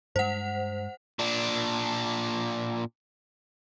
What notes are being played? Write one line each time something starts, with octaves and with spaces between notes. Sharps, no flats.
G2 G#3 C5 F#5
A#2 D4